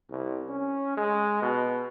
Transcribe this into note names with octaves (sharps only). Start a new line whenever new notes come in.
C2
C#4
G#3
B2